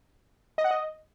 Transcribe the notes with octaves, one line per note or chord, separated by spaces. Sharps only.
D#5
F#5
D#5